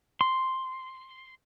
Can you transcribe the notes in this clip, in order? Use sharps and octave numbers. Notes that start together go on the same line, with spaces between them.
C6